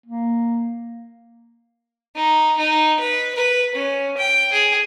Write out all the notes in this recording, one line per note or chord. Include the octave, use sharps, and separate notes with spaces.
A#3
D#4
D#4
B4
B4
C#4
G5
G#4